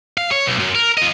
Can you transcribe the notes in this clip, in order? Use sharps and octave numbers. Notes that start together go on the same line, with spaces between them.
F5
C#5
B1
F#2
A#4
F4 D#5